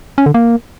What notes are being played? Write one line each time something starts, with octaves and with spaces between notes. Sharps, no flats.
C#4
D3
A#3